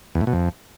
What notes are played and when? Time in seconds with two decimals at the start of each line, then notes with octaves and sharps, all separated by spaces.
0.15 E2
0.21 A2
0.27 B2
0.33 F2